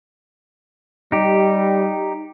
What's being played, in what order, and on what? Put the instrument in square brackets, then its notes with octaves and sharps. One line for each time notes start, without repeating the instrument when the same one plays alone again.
[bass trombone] G3 [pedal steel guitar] D#4 G4